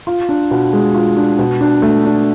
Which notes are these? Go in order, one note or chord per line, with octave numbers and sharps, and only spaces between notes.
F4
D4
B2
G#3
F4
D4
B2
D4
A3
D4